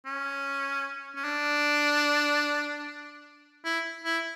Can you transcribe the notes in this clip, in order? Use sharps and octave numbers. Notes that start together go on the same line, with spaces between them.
C#4
C#4
D4
E4
E4